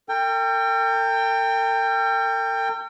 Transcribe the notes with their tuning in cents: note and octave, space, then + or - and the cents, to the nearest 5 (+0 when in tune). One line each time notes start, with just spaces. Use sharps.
A#4 -45 G5 +15